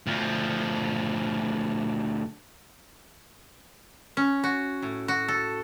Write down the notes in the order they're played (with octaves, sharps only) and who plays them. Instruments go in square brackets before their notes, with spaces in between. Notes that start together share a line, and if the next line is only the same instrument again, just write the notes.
[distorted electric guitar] D2 F3
[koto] C#4
F#4
A2
F#4
A4